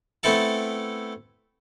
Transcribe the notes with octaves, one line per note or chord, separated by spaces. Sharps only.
A3 B3 C4 E4 A4 A5